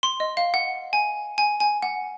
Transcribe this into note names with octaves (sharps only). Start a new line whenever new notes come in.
C6
D#5
F5
F#5
G#5
G#5
G#5
F#5